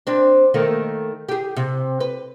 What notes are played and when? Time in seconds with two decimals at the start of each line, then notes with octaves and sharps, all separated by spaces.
0.07 C4 D4
0.54 D#3 A3 A#3
1.29 G4 G#4
1.57 C3
2.00 B4